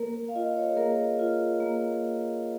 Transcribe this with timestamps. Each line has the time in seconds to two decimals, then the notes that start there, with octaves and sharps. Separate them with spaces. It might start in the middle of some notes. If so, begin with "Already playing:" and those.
Already playing: A#3 A#4
0.15 A#4
0.29 F5
0.35 F4 D#5
0.56 C#5
0.72 G#4
0.77 A#3 A#4
1.19 F4
1.60 A#3